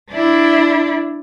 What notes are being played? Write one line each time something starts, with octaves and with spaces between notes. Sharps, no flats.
D4 E4